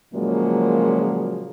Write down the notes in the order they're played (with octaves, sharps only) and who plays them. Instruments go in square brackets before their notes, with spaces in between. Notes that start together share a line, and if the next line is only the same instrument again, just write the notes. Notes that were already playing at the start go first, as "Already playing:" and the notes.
[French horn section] A#2 C#3 F3 F#3 G#3 A#3